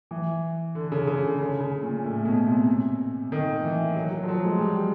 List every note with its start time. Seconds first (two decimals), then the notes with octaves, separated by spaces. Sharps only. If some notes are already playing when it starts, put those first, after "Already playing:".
0.11 E3
0.75 D3
0.92 C#3
1.07 C#3
1.24 D3
1.39 C#3
1.60 C#3
1.82 A#2
2.04 A2
2.25 B2
2.46 C3
3.32 D#3
3.64 E3
3.96 F#3
4.12 F#3
4.23 F3
4.28 F#3
4.45 G#3
4.61 G3